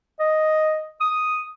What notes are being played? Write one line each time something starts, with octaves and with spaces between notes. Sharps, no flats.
D#5
D#6